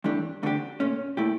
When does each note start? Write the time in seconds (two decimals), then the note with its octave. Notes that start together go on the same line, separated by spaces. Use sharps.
0.04 G2 E3 A3 D4 G4
0.43 D2 D3 A3 D4 G4
0.80 A#2 A3 C#4
1.17 A#2 A3 E4 G4